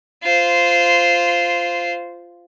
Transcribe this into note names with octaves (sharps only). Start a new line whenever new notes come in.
F4 C5